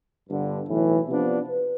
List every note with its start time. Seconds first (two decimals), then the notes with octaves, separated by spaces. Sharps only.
0.29 G1 G2 D3
0.68 B1 A2 E3
1.08 C3 F3 B3 D4
1.47 B4